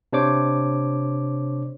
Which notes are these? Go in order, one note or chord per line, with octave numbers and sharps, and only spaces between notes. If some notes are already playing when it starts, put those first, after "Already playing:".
C3 D4 C5 C#5 D6